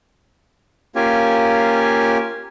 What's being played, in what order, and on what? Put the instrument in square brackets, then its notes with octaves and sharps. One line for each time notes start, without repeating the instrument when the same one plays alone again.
[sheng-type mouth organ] A#3 C#4 F4 G4 G#5